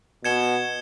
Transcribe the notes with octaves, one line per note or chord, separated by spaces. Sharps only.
B2 G#6 C#7 E7 G7